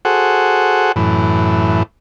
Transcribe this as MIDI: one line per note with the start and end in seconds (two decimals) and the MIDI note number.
0.05 0.92 66
0.05 0.92 68
0.05 0.92 69
0.05 0.92 72
0.05 0.92 78
0.96 1.83 42
0.96 1.83 45
0.96 1.83 52